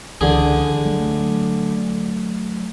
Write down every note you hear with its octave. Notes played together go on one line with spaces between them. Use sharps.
C#2 D3 E3 G#4
F#3 A3